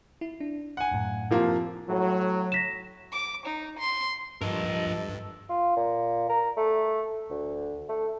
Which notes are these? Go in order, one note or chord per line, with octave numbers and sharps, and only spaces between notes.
E4
D4
F#5 G#5
F#2 A2
C3 F3 A#3
A2 F#3
A#6 B6 E7
D6
D#4
C6
G2 F3 A4 A#4 D#5
F4
A#2
A#4
A3
D2
A3